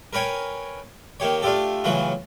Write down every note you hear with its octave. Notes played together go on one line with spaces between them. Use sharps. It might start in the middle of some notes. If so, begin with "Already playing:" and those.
A#4 B4 C#5 G5 G#5
D#3 A#3 G4 C#5
A3 D4 F4 G4 A4
A2 C#3 E3 F#3 F4 F#4